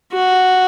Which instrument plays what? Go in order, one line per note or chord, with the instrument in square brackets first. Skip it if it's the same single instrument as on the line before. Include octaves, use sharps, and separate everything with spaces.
[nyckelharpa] F#4